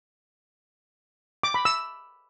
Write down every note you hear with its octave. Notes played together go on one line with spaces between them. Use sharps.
D6
B5
E6